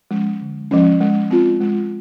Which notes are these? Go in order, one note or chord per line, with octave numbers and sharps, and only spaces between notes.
F3 G#3 C#4
D3
F3 G#3 C#4
G#3
C4 F4
G#3